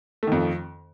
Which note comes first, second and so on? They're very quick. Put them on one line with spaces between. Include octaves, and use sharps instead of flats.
A3 D#3 F2